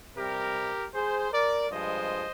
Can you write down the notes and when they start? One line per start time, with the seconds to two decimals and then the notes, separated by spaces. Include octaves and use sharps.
0.16 C3 G3 G4 A#4
0.93 G#4 C5
1.32 A#4 D5
1.71 G2 F3 G#3 C5 D#5